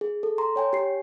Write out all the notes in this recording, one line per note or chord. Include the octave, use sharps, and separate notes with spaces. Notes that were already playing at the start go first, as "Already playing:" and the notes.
G#4
A4
A#5 C6
C#5 G5 G#5
G4 C7